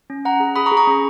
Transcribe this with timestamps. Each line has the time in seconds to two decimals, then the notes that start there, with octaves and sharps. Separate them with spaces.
0.10 C#4
0.25 C#4 F#5 A#5
0.40 G#4
0.56 G#4 B5 D#6
0.66 A#5 C#6
0.72 G#4
0.77 A#5 C#6
0.87 C#4